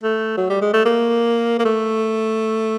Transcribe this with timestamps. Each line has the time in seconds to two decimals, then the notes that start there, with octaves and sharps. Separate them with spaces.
0.03 A3
0.37 F#3
0.50 G3
0.61 G#3
0.73 A3
0.85 A#3
1.59 A#3
1.65 A3